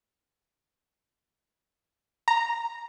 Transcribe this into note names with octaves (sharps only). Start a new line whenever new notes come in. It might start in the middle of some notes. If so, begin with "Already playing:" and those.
A#5